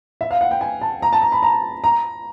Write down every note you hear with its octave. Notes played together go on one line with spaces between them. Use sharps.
E5
F5
F#5
G5
G#5
A5
A#5
A5
A#5
B5
A#5
A#5